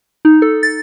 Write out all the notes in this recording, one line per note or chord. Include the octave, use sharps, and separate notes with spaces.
D#4
A4
A6